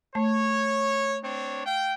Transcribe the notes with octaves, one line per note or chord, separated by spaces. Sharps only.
A3 C#5
C4 D4 C#5
F5 G5